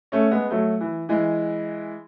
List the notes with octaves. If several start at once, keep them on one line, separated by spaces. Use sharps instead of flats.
A3 C#4
G#3 B3
F#3 A3
E3
E3 G#3